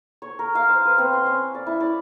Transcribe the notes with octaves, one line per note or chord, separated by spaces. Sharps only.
C#5
A#4
F5
C5
B4
C4
C6
C#4
D5
E4
D5